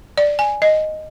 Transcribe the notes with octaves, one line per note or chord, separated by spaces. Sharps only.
D5
G#5
D#5